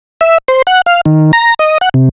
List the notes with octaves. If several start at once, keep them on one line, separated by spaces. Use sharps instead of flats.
E5
C5
F#5
F5
D#3
A#5
D#5
F#5
C3